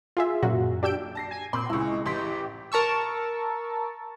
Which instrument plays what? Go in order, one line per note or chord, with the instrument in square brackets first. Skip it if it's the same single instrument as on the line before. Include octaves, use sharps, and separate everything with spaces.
[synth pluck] F4 G#4 E5
F#2 A#2 F#4
D4 G4 E6 G6 D7
[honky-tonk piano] A5 A#6 C7
[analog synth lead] G#5
[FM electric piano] A#2 A#3 [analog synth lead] C4 [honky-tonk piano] B5 C6 D6
[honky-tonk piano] C#2 E6 [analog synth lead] G#3 [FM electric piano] E4 C#6
[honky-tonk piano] A1 C6 B6 [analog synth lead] G4
[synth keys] A#4 A5 C#6 E6